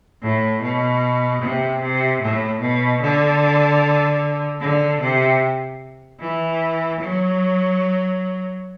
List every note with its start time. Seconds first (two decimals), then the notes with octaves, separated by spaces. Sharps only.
0.22 A2
0.62 B2
1.42 C3
1.82 C3
2.21 A2
2.61 B2
3.01 D3
4.61 D3
5.00 C3
6.20 E3
7.00 F#3